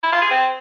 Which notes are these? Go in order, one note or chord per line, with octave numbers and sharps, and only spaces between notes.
E4
F4
G#4
C4